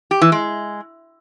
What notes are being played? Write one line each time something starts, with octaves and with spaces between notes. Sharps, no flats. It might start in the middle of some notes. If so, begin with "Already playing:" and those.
G4
E3
G#3